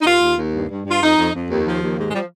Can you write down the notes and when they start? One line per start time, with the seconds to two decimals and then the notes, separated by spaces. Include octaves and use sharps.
0.01 D#4
0.06 D#2 F4
0.22 D#2
0.37 D#2
0.54 G2
0.69 G2
0.85 G2 F4
1.02 F2 D#4
1.17 F2
1.33 F2
1.49 D#2
1.65 F3
1.81 D#2
1.97 G#2
2.08 G#3
2.13 F3 G3